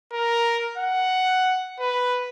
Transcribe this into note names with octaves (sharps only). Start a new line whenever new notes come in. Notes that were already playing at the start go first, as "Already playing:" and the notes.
A#4
F#5
B4